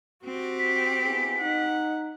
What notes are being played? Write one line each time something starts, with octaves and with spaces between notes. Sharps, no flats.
C4 F#4 G4
B6
B3 E4 G#4
D#4 F#5